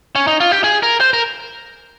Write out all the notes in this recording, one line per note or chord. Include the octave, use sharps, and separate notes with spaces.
C#4
D#4
F4
G4
G#4
A#4
C5
A#4